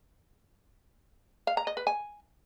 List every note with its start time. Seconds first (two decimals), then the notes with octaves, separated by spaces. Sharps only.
1.47 F5
1.57 A#5
1.67 D#5
1.77 B4
1.87 G#5